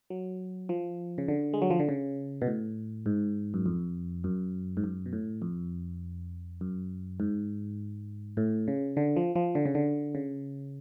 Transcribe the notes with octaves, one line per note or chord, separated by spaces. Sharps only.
F#3
F3
C#3
D3
G#3
F#3
F3
D3
C#3
B2
A2
G#2
F#2
F2
F#2
G#2
F#2
B2
A2
F2
F#2
G#2
A2
C#3
D3
F3
F3
D3
C#3
D3
C#3